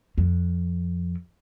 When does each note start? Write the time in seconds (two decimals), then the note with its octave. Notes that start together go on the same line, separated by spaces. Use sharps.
0.18 F2